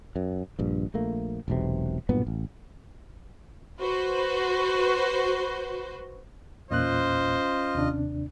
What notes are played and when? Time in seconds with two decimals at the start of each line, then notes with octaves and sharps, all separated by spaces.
0.16 F#2
0.59 A#1 G2
0.94 A#1 A3 A#3
1.48 E1 B1 C3
2.09 B1 G2 A#2 B3
2.27 A1
3.79 F#4 B4 C5
6.71 E2 A#2 C#4 F4 C5 D#5 F#6
7.75 D#2 C3 D4